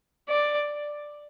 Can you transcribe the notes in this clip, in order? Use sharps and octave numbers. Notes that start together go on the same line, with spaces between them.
D5